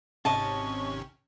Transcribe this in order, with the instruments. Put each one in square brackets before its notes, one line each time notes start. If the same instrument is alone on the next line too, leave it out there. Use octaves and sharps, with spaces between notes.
[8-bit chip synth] G#1 C3 C#4 [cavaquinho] D#5 A5 [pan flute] C#6